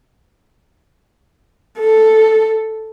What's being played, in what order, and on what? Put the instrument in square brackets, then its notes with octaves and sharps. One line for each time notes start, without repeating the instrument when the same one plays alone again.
[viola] A4